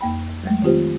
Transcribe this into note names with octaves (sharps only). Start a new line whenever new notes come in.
F2 A#3 G5 B5
F#3 G#3 A3
D#3 C4 F4 G4 C5